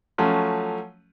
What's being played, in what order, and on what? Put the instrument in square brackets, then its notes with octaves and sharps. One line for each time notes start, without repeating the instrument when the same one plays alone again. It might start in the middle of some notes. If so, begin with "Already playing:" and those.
[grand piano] F3 F#3 A3 C#4